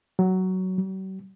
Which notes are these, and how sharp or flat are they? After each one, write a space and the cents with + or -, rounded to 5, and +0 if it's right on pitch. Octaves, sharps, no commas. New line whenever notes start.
F#3 +10
F#3 +45